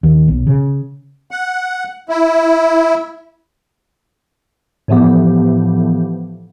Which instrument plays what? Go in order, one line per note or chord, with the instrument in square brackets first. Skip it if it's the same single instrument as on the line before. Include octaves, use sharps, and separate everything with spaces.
[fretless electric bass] D#2
B1
C#3
[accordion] F#5
E4
[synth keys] A2 E3 F3 A3 B3 G4